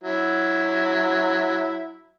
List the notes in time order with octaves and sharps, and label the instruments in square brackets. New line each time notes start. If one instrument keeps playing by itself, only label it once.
[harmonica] F#3 E4